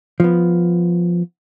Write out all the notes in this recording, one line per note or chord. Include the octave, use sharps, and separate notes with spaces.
F3 B3